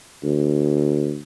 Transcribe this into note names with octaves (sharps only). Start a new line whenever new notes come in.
D2